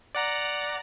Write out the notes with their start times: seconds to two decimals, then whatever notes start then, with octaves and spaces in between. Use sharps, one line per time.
0.15 D5 F#5 A#5